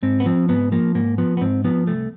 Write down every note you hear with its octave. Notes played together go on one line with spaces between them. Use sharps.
G#2 C4
B3
F3 C4
G#2 B3
F3 A#3
G#2 A#3
F3 B3
B3
G#2 C4
F3 B3
C2 A3